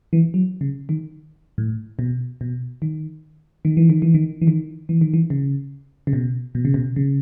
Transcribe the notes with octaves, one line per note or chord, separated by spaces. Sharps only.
E3
F#3
C#3
D#3
A2
B2
B2
D#3
D#3
E3
D#3
E3
D#3
E3
D#3
E3
D#3
E3
C#3
C#3
B2
B2
C#3
B2
C#3